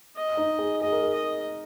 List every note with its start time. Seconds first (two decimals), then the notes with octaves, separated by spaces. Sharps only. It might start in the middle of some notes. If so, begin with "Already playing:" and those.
0.16 D#5
0.37 D#4
0.59 G#4
0.81 G#4 D#5
0.92 A#4
1.03 G#4
1.14 D#5